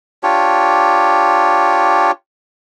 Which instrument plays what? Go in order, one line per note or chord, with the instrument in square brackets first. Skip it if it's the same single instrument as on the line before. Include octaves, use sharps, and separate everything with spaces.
[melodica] D4 F4 G4 C#5